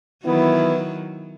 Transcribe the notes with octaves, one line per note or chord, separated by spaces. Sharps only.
D#3 E3 F#3 B3 E4